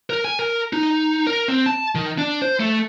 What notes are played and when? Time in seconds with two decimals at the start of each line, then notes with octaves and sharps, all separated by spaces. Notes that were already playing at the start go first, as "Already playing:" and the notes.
0.10 A#4
0.25 G#5
0.39 A#4
0.73 D#4
1.27 A#4
1.48 C4
1.66 A5
1.95 D#3
2.18 D4
2.42 C5
2.60 A3